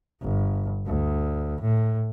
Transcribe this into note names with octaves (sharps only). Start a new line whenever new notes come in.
G1
D2
A2